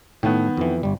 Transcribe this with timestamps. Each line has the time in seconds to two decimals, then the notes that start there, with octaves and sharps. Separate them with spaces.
0.23 A2 D#3 A3 B3
0.57 F2 E3
0.83 G1 G3